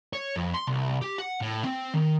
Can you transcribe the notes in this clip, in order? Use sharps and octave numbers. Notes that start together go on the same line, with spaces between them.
C#5
F2
C6
C2
G4
F#5
A2
C4
D#3